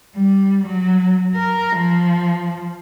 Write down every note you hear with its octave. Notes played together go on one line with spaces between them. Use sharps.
G3
F#3
A#4
F3